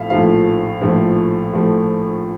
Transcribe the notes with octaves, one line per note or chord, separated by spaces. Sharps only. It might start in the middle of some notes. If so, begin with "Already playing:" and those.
Already playing: A#1 A2 F3 A3 E5 F5
A#1 A2 F3 A3 F5
A#1 A2 F3 A3
A2 F3 A3